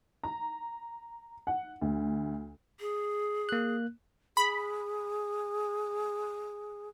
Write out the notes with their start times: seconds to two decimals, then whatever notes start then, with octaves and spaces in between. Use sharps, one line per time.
0.23 A#5
1.47 F#5
1.82 D2
2.80 G#4
3.49 A#3 F#6
4.37 G#4 B5